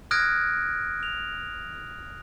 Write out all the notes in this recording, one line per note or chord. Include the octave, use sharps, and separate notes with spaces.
D#6 F6 F#6 G#6 A#6 D7
F7